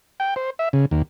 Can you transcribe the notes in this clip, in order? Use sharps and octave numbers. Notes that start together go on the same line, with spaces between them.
G5
C5
E5
C#3
D#2